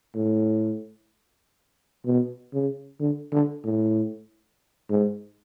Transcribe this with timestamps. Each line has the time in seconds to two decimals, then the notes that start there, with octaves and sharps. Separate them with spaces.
0.15 A2
2.05 B2
2.53 C#3
3.00 D3
3.32 D3
3.64 A2
4.90 G#2